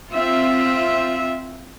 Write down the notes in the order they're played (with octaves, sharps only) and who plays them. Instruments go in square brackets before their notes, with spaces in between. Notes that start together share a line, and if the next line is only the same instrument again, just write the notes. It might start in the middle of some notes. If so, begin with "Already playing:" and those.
[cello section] C4 F4 E5